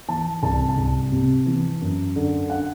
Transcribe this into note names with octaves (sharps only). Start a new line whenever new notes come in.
E3 A5
C2 A5
A5
C2
C3
E3
F#2
D3
D3 F#5